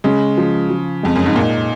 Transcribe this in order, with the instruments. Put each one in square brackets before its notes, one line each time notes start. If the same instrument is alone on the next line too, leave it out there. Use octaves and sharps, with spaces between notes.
[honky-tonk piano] C#3 [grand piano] G#3
[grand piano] F3
F3
[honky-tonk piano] F2 [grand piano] G#3
[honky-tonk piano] F#2
G#2
[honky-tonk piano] A#2 [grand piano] D#4